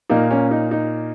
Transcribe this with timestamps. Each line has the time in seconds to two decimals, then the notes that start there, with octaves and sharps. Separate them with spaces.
0.09 A#2 A#3 D#4
0.31 C#4
0.51 D#4
0.71 D#4